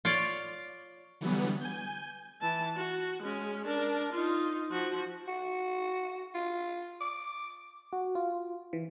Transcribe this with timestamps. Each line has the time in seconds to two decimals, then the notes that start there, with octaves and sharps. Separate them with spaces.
0.05 F4 C#5 D5
1.21 D3 E3 F#3 G3 B3
1.61 G#5 G6
2.41 E3 A5
2.76 F#4
3.22 G#3 C#4
3.66 D4 A#4
4.12 D#4 F4
4.70 F3 F#4
5.28 F#4
6.35 F4
7.01 D6
7.93 F#4
8.15 F4
8.73 E3